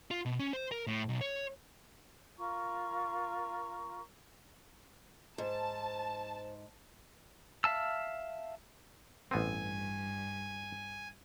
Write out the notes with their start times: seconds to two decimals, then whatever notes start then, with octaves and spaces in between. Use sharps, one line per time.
0.11 F4
0.25 B2
0.39 C#4
0.53 C5
0.71 A#4
0.87 A2
1.09 B1
1.21 C#5
2.38 F4 A#4 A#5 C#6
5.38 G#2 C5 A5
7.64 E5 F5 A5 E6
9.31 A1 G2 B3 C4 G#5